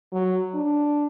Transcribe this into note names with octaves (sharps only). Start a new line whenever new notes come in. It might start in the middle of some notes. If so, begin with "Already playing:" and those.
F#3
D4